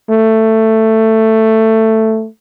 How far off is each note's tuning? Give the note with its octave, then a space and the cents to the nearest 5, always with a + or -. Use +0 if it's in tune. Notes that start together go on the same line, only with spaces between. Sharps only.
A3 +10